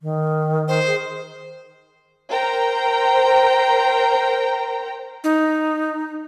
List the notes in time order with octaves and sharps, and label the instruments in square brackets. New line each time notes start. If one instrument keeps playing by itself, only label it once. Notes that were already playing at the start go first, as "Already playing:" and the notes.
[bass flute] D#3
[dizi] C5
[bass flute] G#4
[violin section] A#4 C5 G5 A#5
[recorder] D#4